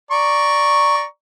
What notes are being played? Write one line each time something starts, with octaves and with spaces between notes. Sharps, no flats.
D5 A#5 C#6